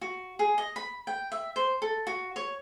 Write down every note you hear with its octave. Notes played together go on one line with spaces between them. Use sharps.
F#4
G#4
D#5
B5
G5
E5
C5
A4
F#4
C#5